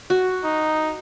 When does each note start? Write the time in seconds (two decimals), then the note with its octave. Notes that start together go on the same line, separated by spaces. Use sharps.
0.10 F#4
0.44 D#4